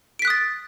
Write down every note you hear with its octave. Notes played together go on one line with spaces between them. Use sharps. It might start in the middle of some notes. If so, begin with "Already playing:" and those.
D#6 F#6 A6 B6 D7